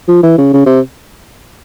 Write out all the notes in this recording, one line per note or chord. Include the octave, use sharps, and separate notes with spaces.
F3
E3
C#3
C#3
C3